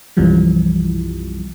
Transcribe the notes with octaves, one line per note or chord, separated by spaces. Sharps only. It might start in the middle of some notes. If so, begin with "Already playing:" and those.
B1 F#2 C3 E3 F3 G3